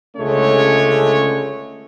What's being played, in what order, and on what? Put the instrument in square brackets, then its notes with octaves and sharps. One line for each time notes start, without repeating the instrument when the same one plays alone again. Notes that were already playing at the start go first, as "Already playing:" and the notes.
[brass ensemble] C#2 D3 G#3 A3 C#4 C#5